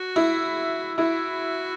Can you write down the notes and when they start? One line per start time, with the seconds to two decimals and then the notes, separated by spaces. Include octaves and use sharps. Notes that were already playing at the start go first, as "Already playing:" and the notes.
Already playing: F#4
0.16 E4
0.97 E4 F#4